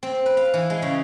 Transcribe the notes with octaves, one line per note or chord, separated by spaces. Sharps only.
C4
B4
F5
E3
G#3
C#3